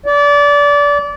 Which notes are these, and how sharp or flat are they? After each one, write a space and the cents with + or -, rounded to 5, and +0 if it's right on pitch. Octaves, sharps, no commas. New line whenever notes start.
D5 -25